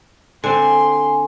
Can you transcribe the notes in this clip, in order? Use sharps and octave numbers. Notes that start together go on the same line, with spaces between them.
D3 C4 G#5 C6